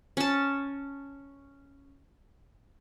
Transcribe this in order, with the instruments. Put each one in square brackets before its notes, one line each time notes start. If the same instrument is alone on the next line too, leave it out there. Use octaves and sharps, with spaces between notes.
[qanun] C#4 A5